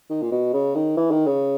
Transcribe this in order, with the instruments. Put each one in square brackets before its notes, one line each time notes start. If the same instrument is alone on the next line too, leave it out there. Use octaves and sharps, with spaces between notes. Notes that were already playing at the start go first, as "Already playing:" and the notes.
[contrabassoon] D#3
A#2
B2
C#3
D#3
E3
D#3
C#3